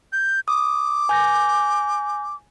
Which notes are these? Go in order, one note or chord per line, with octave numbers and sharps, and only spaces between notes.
G6
D6 D#6
G#5 G6 A#6